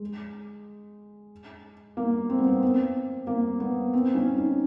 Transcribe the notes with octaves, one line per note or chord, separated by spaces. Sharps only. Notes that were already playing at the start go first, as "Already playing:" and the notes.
Already playing: G#3
A#3
C4
B3
C4
C4
A#3
B3
C4
C#4
D#4